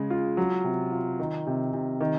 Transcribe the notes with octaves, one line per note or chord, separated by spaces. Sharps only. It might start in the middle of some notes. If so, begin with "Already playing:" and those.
Already playing: C#3 G#3
F4
F#3
C3
F4
D#3
C3
C3
D#3